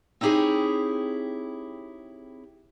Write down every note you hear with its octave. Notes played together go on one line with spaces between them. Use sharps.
C4 D#4 E4 G4 G#4 C#5